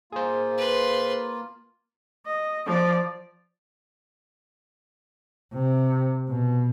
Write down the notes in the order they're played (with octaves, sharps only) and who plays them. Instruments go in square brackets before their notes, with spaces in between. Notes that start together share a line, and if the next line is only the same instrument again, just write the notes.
[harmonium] A#3 F4 [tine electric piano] G#4 C5
[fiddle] B4 C6
[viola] D#5
F3 D5
[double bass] C3
B2